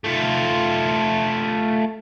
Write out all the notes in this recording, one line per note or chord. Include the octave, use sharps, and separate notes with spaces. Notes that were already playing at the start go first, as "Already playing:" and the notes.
A3 F4